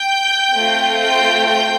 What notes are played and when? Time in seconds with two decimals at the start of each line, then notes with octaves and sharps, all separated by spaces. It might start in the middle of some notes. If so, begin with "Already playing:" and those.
Already playing: G5 G6
0.55 A3 C4 F4
1.00 G5 G6
1.46 G5 G6